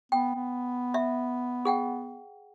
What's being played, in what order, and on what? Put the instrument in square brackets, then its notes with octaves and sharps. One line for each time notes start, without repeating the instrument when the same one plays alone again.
[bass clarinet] B3 [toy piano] G5
[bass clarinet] B3
[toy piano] E5
G#4 F#5 G5